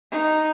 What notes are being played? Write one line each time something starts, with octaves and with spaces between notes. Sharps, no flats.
D#4